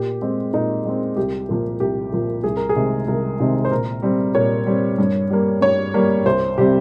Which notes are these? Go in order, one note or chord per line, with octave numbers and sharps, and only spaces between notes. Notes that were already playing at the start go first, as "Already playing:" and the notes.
Already playing: A#2 G4
G#3 C4
A#2 D#4
G#3 C4
C2 G4
A#2 F3 A#3
C2 G4
A#2 F3 A#3
C2 G#4
A#4
G#4
C3 D#3 G#3 C4
C2 A#4
C3 D#3 G#3 C4
C5
A#2 A#4
G3 C4
A#2 C#5
G3 C4
G2
G3 A#3
G2 C#5
G3 A#3
C2 C5
C3 G3 C4 G4